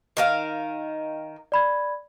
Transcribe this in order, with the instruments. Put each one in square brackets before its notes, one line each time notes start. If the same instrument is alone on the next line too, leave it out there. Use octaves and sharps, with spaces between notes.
[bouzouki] D#3 A#4 F5
[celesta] D5 B5 G#6